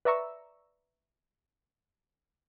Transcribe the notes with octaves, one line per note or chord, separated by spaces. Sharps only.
B4 D5 E5 A#5 C#6 E6